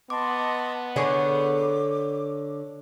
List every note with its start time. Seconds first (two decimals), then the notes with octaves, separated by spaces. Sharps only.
0.10 B3 D#5 A5 C6 D6
0.96 D3 D4 G#4 C#5 C#6 D6